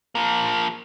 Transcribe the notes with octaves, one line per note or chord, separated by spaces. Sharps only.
F3 A#3